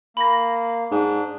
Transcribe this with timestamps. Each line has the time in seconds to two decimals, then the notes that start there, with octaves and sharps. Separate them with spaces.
0.17 A#3 B5 A#6
0.91 G#2 D4